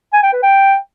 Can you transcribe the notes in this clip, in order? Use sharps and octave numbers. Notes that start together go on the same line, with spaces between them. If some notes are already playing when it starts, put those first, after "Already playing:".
G#5
G5
B4
G5